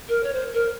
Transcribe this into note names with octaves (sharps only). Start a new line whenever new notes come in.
A#4
C#5
C5
A#4